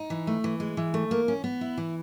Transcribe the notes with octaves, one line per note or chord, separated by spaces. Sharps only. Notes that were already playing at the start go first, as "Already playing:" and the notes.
Already playing: D#4
E3
A3
E3
G#3
E3
A3
A#3
C#4
B3
E4
E3